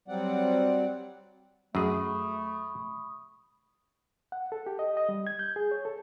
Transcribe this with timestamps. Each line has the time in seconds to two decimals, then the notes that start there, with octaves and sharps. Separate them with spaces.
0.08 F#3 G3 C4 D5 F#5
1.75 F#2 A3 G#4 B5 C#6 D#6
4.32 F#5
4.52 A4
4.66 G4
4.79 D#5
4.97 D#5
5.09 G3
5.27 G#6
5.39 G6
5.56 G#4
5.71 C#5
5.85 A4